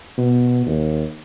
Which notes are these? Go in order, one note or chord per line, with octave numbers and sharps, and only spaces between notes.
B2
D#2